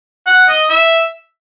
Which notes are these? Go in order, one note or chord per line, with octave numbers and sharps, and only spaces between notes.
F#5
D#5
E5